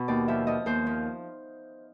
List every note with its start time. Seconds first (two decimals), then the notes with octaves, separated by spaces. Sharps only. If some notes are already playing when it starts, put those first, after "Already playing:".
Already playing: B2
0.08 D#2 D5
0.28 F3 E5
0.47 F3 D#5
0.66 D#2 C5
0.86 F3